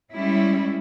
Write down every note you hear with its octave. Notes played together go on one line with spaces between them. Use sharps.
G3 G#3 C#4 E4